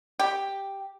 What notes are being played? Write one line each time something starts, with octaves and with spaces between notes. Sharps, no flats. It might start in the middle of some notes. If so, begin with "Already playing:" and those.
G4